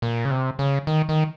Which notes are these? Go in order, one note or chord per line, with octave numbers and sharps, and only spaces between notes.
A#2
C#3
C3
C#3
D#3
D#3